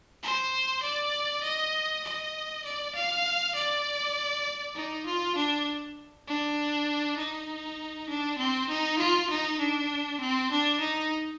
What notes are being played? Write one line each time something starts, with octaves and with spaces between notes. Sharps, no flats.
C5
D5
D#5
D#5
D5
F5
D5
D#4
F4
D4
D4
D#4
D4
C4
D#4
F4
D#4
D4
C4
D4
D#4